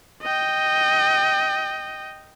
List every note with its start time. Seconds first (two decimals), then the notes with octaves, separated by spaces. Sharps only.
0.22 D#5 G5